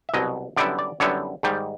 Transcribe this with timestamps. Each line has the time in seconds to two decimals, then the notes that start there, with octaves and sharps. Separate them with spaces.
0.09 E5
0.14 C2 B2 F#3 D#5
0.57 F#2 D3 G3 B3 E4 D5
0.79 D5
1.00 F#2 D3 G3 B3 E4 C#5
1.43 G#2 D#3 G3